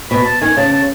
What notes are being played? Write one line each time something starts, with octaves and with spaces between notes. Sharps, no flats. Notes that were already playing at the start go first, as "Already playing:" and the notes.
B2 B5
A5
D#3 G#5
C#3 A5
A5